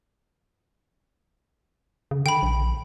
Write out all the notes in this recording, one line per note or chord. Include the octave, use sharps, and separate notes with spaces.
C#3
D3 G5 B5
A#1